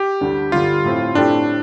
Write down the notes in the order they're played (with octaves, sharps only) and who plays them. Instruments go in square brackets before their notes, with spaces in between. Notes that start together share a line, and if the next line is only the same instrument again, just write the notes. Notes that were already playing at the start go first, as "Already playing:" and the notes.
Already playing: [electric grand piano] G4
[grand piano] D2 D3 G3 D4
[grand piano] G2 D3 G3 [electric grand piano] F4
[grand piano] A2 A3 C4
[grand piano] A2 A3 C4 G4 [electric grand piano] D4